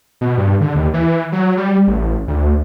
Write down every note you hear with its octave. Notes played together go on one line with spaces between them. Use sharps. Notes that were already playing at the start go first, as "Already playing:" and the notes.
B2
G2
D3
D#2
E3
F#3
G3
A1
D2